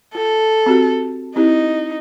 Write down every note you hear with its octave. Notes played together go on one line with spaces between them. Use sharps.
F4 A4
C4 F#4 G4
C4 D#4 E4 G4